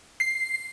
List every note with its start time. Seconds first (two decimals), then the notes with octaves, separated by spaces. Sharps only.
0.20 C7